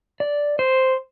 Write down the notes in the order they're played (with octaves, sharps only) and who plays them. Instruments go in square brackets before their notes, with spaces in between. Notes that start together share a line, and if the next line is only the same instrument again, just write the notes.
[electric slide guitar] D5
C5